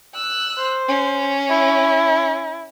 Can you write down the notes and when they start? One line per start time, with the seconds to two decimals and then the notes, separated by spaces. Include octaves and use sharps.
0.15 E6 F#6
0.58 C5
0.88 C#4
1.49 E4